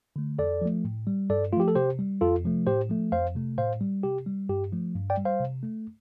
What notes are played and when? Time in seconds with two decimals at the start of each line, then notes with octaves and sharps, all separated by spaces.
0.16 D3 A3
0.39 F2 A4 D5
0.62 F3 A3
0.85 A2
1.07 G3
1.30 G2 A4 D5
1.52 A3 F4
1.57 F3 G4
1.68 A4
1.75 C3 G4 C5
1.99 G3
2.21 F2 F4 A4
2.44 C3 F3 A3
2.66 A2 G4 C5
2.89 F3 A3
3.12 F2 C5 F5
3.35 C3 A3
3.58 A2 C5 F5
3.81 G3
4.04 C3 G4
4.26 G3
4.49 G2 G4
4.72 F3 A3
4.95 G2
5.10 D5 G5
5.18 G3
5.25 C5 F5
5.40 C3
5.63 A3